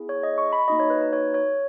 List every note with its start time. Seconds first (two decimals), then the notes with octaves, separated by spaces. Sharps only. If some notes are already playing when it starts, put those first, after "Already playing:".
Already playing: B3 E4 G#4
0.09 C#5
0.23 D#5
0.38 C#6
0.53 B5
0.68 A#3 D#4 F#4 D#5
0.80 C#5
0.90 B4
1.01 B4
1.13 C#5
1.34 C#5